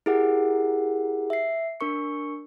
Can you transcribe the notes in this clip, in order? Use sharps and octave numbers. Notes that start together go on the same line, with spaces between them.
E4 G4 G#4 A#4 F#5
E5 C7
D4 A#4 C#6 C#7